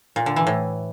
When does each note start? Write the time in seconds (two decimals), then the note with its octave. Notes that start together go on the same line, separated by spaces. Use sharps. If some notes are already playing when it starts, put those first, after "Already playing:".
0.16 A#2
0.26 D3
0.36 E3
0.47 A2